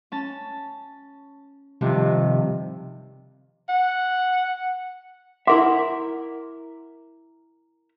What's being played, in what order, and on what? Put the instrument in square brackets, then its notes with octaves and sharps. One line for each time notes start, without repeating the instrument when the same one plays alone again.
[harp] C#4 A5
[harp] G2 D#3 F3 [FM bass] C3
[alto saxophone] F#5
[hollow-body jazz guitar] E4 A#4 E5 [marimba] F#5 [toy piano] C6 D6